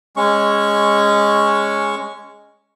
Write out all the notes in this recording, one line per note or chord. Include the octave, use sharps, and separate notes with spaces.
G#3 C#4 C#6